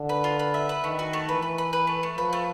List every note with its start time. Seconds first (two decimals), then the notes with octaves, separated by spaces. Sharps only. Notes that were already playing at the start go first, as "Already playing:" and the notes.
Already playing: D3
0.09 B4
0.24 F4
0.39 B4
0.54 E5
0.69 B4
0.84 D#3 A3
0.99 F#4
1.13 A3
1.28 E3 B4
1.43 B4
1.58 B4
1.73 B4
1.87 A3
2.03 A3
2.17 F3 B4
2.33 A3